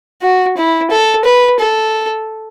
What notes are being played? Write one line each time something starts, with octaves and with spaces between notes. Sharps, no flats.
F#4
E4
A4
B4
A4